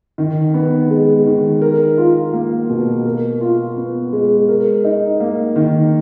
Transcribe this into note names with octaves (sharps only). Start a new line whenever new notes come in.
D#3
B3
G#3
D#3
A#4
F4
A#3
B2
A#4
F4
B3
G#3
A#4
D#4
A#3
D#3